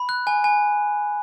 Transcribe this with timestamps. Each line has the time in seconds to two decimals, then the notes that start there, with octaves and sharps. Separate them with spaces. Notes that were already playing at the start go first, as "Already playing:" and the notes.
Already playing: B5
0.09 F#6
0.27 G#5
0.44 G#5